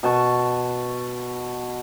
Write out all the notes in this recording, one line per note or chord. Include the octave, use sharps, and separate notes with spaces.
B2 A5 C#6